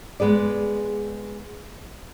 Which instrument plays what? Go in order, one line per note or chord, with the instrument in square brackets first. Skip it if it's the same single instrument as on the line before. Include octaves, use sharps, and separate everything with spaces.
[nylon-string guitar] G#3 B3 G#4 D5